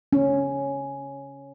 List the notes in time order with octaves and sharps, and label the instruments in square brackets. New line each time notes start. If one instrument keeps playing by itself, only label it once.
[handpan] C#4